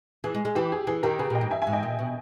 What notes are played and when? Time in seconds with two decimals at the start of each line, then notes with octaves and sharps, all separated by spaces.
0.24 E3 G#4
0.35 G#3
0.45 G#3
0.55 E3 G4
0.72 G#4
0.87 E3 G#4
1.03 D#3 G4 A#4
1.19 C#3 G#4 B4
1.30 A#2
1.35 D#5 G5
1.41 G#2
1.51 G2 E5 G#5
1.62 E5 G#5
1.67 G#2
1.73 D#5 G5
1.83 A#2
1.99 B2